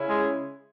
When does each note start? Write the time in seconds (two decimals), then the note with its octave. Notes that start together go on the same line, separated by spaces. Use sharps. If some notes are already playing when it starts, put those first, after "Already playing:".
Already playing: C#3 C#4 E4
0.09 G#3 G#4